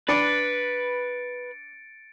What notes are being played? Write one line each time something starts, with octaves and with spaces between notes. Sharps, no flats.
D4 B4 D5 A6 C#7 D7